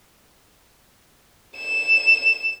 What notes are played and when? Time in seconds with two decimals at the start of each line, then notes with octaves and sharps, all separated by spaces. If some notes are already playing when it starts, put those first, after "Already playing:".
1.57 E7